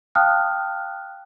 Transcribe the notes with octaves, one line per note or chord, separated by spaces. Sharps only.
F5 G5 A5 D#6 F6 F#6